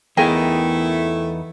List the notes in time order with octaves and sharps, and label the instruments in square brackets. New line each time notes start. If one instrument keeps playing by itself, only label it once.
[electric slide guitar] E2 B3 D#4 [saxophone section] A3 E4 [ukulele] G#4 A#4 G5